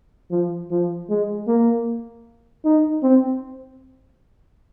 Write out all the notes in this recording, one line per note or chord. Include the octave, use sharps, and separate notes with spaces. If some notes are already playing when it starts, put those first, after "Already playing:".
F3
F3
G#3
A#3
D#4
C4